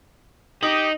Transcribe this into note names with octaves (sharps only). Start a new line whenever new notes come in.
D#4 G4 D#6 F#7